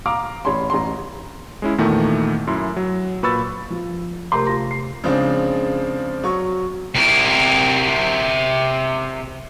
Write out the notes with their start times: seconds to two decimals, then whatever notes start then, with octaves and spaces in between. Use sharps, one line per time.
0.06 F5 A#5 D6
0.45 A1 C#5 B5 C6
0.70 A1 A#5 C6
1.62 G#3 C#4 E4
1.78 E2 A#2 D#3 E3 A3
2.47 F#2 E4 C6
2.76 F#3
3.23 A#2 B4 B5 C#6 E6 A6
3.70 F3
4.32 C3 A3 G4 A#4 A#5 C6
4.46 F4 A#5 C6 A#6
4.71 C7
5.04 C#3 F3 G#3 C4 D4
6.24 F#3 C#6
6.95 C3 A#4